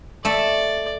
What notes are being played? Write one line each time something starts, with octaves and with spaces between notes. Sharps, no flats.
A3 D5 E5